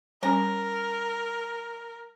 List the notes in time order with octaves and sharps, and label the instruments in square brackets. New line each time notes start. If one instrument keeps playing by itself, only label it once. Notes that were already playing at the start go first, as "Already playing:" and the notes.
[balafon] G3 C#4 [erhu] A#4 [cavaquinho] A#5